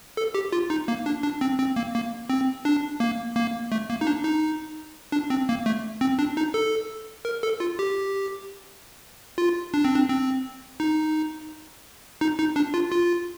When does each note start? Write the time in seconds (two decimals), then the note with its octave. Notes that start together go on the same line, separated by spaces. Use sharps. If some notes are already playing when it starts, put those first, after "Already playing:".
0.17 A4
0.34 G4
0.52 F4
0.70 D#4
0.88 A#3
1.06 D4
1.23 D4
1.41 C4
1.59 C4
1.76 A#3
1.95 A#3
2.30 C4
2.65 D4
3.00 A#3
3.36 A#3
3.72 A3
3.90 A#3
4.01 D#4
4.07 D4
4.24 D#4
5.12 D4
5.30 C4
5.49 A#3
5.66 A3
6.01 C4
6.19 D4
6.37 D#4
6.54 A4
7.25 A#4
7.43 A4
7.60 F4
7.79 G4
9.38 F4
9.74 D4
9.85 C4
9.95 D4
10.09 C4
10.80 D#4
12.21 D#4
12.39 D#4
12.56 D4
12.74 F4
12.92 F4